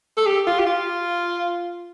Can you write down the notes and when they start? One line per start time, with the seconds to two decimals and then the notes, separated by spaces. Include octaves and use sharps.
0.17 A4
0.26 G4
0.47 F4
0.59 G4
0.66 F4